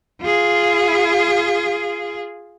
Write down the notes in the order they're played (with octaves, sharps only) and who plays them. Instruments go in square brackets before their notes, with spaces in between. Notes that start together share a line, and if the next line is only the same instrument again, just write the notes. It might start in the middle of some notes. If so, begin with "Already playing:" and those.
[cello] F4 G#4